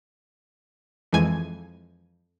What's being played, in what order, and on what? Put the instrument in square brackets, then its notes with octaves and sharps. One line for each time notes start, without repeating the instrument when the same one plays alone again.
[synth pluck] F2 E3 G#3 G#5 G#6